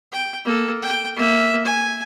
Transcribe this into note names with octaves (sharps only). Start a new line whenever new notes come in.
G5
A#3 A4
G5
A#3 E5
G#5